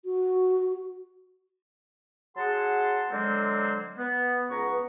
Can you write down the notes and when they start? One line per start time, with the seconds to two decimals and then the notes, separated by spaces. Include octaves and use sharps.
0.05 F#4
2.37 F#3 G#4 F#5 A5 C6
3.11 D3 F#3 G#3 A#3 C4
3.98 B3
4.50 C#2 B3 B4 A#5 C#6